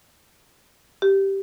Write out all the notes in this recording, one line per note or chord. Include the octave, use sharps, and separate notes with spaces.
G4